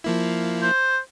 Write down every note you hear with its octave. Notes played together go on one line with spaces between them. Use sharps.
F3 A#3 E4
C5